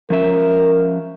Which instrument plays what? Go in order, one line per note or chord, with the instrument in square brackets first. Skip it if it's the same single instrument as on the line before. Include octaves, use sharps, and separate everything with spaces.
[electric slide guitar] F3 C#4 E5 [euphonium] A#4